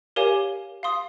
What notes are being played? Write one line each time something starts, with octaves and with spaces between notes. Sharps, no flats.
G4 A#4 C#5 F5 G#5
F5 C6 D#6